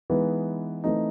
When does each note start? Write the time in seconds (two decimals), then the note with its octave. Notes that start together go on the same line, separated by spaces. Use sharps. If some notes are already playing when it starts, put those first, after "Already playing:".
0.10 E3 G#3 B3 D#4
0.84 E3 A3 C4 D#4